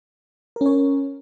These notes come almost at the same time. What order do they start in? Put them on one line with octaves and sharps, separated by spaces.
A#4 C#4 C#5